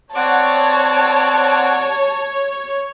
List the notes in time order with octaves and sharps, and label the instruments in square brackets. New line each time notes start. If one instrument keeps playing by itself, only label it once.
[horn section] C4 D5 F#5 [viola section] C#5 [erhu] A5